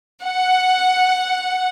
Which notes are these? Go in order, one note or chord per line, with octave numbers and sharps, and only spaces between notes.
F#5